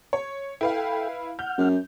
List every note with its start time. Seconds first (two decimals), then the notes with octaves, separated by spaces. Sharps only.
0.13 C#5
0.61 E4 A4 B4 F5 G5
1.39 F#5 F6 G6
1.58 F#2